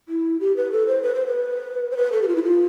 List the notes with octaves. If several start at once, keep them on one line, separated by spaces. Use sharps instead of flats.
E4
G4
B4
A4
C5
B4
C5
B4
C5
B4
A4
G4
F4
E4
F4